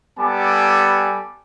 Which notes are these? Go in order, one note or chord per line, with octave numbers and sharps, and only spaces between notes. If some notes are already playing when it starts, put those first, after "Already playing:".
G3 B3 A4 G#5 A5 D6